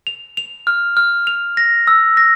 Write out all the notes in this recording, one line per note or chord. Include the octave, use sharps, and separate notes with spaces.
F7
F7
F6
F6
F7
A#6
E6
A#6